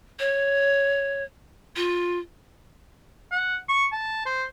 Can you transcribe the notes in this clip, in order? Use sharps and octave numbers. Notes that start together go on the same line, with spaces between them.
C#5
F4
F#5
C#6
A5
C5